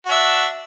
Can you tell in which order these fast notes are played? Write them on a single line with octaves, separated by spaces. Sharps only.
F#4 D4 E5